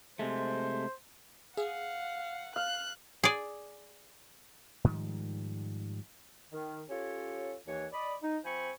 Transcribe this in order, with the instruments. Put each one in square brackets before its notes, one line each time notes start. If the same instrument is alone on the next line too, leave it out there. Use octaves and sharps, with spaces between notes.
[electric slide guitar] C3 G#3 A3 [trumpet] C5
[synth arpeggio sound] G#4 [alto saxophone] F5 [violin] F#5
[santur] F5 [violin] F#6
[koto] G#4 D5
[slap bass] G#2 D#3 F3 G3
[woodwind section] D#3
C#4 F4 G4 A4 C#5
D#2 E3 C#5
D5 D#5 B5
D#4
F3 C4 C5 G#5 B5 C#6